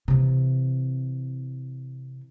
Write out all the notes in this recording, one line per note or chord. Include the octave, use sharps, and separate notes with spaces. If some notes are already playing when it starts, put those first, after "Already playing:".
C3 E3